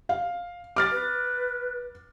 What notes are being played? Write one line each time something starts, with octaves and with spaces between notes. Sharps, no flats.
F5
D6 F6 A6
B4